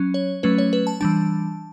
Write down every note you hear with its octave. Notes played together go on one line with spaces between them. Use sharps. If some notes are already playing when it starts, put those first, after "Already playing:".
Already playing: F#3 C#4
C#5
F#3 A3 C#4 B4
C#5
B4
A5
E3 G3 D4 A5